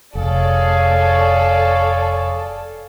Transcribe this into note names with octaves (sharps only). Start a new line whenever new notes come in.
F1 G#4 A4 C#5 D5 F5